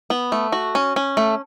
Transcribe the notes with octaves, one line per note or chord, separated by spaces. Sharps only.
B3
A3
F#4
C#4
C#4
A3